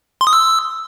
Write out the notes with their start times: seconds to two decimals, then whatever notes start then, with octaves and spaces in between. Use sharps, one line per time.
0.21 C6
0.27 D#6
0.33 E6